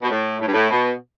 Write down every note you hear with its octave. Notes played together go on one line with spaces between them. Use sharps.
B2
A2
A2
G2
A2
B2